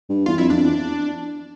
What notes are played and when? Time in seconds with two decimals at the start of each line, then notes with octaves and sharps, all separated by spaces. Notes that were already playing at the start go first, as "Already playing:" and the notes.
0.09 G2
0.26 E2 F4
0.38 F2 E4
0.50 F2 D4
0.62 E2